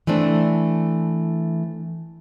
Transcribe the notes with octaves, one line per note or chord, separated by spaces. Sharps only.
E3 A3 C4 D4